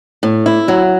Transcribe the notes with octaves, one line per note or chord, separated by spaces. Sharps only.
A2
E4
F#3